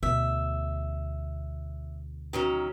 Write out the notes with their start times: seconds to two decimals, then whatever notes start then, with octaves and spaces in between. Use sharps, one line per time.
0.03 D2 B2 E5
2.33 D#3 F#3 C#4